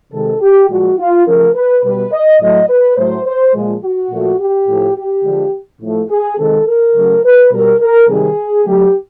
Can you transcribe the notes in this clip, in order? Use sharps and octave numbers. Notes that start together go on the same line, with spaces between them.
C3 D#3 G#3 A4
G4
A#2 F3 G#3 F#4
F4
C#3 F3 A3 A#4
B4
B2 G3 B4
D#5
A2 F#3 A3 D#5
B4
A2 F#3 A3 C5
C5
A#2 F3 G#3
F#4
A#2 F3 A3
G4
A2 F3 A3
G4
D3 F3 G#3
A2 F3 A3
G#4
C3 D#3 G#3 A4
A#4
C#3 F#3 A3
B4
B2 G3 A#4
A#4
C3 D#3 G3 G#4
D3 F#3 A3 G4